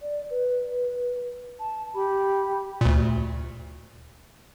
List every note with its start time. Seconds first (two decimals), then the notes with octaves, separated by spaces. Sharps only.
0.01 D5
0.30 B4
1.60 A5
1.95 G4 B5
2.81 D2 A#2